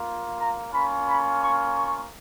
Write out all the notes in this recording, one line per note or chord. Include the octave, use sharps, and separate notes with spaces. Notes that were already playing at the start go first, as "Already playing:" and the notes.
Already playing: A#3 F4
A#5
A#3 C#4 F4 B5
B5
C#6
C#6